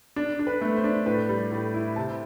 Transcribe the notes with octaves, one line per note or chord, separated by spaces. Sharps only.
D4
D4
B4
A3
C5
D4
A2 B4
G3
A2
E4
C3 A5